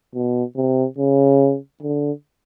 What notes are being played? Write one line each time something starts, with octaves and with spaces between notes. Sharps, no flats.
B2
C3
C#3
D3